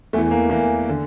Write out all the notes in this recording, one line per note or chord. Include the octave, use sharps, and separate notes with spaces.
E2 E3 A3
A#3
E2 E3 A#3
D3